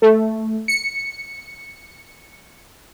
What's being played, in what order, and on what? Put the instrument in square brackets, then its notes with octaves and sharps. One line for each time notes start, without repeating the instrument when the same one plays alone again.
[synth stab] A3
C#7